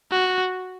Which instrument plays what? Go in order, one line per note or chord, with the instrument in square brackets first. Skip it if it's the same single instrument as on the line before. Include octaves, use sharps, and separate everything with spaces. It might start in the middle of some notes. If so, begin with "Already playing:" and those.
[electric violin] F#4